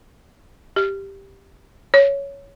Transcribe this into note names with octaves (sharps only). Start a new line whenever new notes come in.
G4
C#5